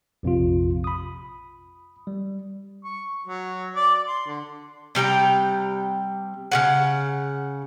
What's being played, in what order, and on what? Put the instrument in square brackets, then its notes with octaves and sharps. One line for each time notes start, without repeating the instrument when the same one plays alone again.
[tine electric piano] A#1 F2 C3 F4
B5 D#6
G3
[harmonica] C#6
F#3
D5
C6
D3
[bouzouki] C3 G3 G5 A#5
C#3 G#3 F#5